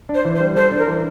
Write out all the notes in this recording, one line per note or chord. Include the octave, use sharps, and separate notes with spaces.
D4
C5
E3
C5
G3
A4 C5
D4
A#4
E3